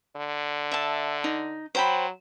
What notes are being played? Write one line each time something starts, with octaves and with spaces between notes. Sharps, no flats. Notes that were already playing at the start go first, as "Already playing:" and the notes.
D3
E5 A5
D#4
F#3 C5 G5 B5